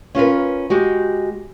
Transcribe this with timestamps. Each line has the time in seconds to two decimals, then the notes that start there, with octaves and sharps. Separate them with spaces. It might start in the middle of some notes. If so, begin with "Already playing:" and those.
0.15 C#4 F4 A#4 B4
0.70 G#3 F#4 G4